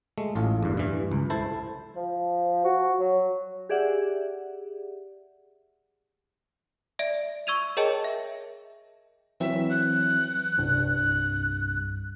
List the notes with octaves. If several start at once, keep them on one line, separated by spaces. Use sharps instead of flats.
G#3 A3
A1 A2 F4
E2 G2
G2 E3
C#2
E4 A4 C5
F3
F#4
F#3
G4 G#4 D5 E5 F#5
D5 E5 D7
C#6 E6 G#6 D#7 F7
G#4 A#4 C#5 D#5 G5 A5
E5
E3 F#3 C4 E5
F#6
C2 G2